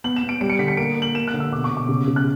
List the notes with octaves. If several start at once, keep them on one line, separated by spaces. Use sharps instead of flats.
B3 F#7
E7
B3
D7
G3 D7
C#7
D3 B6
C#7
A#3 D7
A#3
F#7
A#3 E7
F#6
D3
E6
B2 D6
C#6
B2
D6
C#3
C#3
F#6